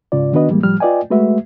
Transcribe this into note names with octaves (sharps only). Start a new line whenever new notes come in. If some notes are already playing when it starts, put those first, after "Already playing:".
G#2 C#3 F4 D5
D#3 B3 D4 F#4 B4 D#5
A2 E3 G3 G#3 A#3
A2 F3 G3 F6
F4 B4 D5 D#5 G5 G#5
G#3 A3 F#4 B4 E5